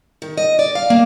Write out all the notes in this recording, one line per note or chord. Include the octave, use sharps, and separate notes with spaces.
D#3
D#5
D5
F5
A#3